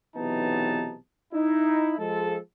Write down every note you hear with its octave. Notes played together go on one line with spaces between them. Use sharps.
B1 C3 E3 B3 D#4 A5
D#4 E4
F3 G#3 A4